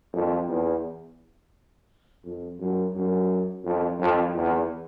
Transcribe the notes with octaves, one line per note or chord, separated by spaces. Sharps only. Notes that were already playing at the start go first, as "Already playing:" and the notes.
F2
E2
F2
F#2
F#2
F2
F2
E2